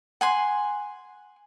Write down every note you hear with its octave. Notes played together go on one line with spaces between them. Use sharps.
F#5 G#5 C6